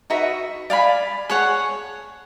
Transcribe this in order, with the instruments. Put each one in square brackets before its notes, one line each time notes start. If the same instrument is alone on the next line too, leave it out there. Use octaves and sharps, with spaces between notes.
[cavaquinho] D#4 F#4 B4 E5
D5 F5 G#5 B5
G#4 C#5 F#5